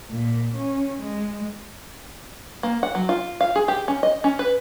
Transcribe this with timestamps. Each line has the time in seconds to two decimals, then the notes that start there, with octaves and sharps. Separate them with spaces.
0.11 A#2
0.54 C#4
1.02 G#3
2.63 A#3
2.83 F#5
2.95 F#3
3.09 F4
3.41 F5
3.56 G#4
3.68 G4
3.88 C#4
4.03 D#5
4.24 C#4
4.39 B4